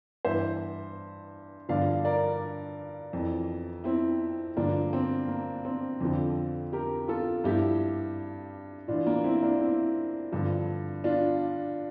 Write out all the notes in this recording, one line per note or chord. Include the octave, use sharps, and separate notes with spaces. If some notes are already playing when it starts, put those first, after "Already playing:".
G2 E3 C5 E5
G2 D3 F3 D5 F5
A#4 D5
F2 E3
C4 E4
G2 D3 F3 A#3 D4
C4
A#3
C4
F2 D3 F3
G4 A#4
F4 A4
G2 F3 E4 G4
A2 E3 D4 F4
A#3 D4
C4 E4
A#3 D4
C4 E4
G2 D3 F3
D4 F4